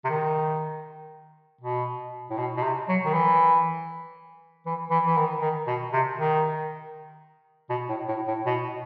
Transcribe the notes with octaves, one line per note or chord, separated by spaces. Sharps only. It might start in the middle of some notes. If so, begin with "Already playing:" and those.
C3
D#3
B2
A2
B2
B2
C3
F#3
D#3
E3
E3
E3
E3
D#3
D#3
B2
C3
D#3
B2
A2
A2
A2
B2